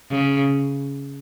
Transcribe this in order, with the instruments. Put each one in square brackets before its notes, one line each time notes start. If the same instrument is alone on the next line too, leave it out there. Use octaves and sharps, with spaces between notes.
[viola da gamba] C#3